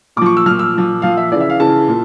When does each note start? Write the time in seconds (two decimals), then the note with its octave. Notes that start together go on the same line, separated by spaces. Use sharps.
0.16 A#2 D6
0.21 F3 C#6
0.37 E6
0.46 A#2 F3 F6
0.59 E6
0.74 A#2 F3
1.02 A#2 F3 F5
1.17 E5
1.32 C#3 E3 D5
1.40 E5
1.50 F5
1.60 C#3 E3 A5
1.88 A#2